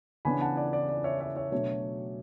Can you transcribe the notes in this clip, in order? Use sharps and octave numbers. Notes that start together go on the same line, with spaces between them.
C#3 E3 B3 D4 G#5 B5
F#5 A5
D5
D5
D5
C#5 E5
C#5 E5
C#5 E5
B2 F#3 A3 D4 C#5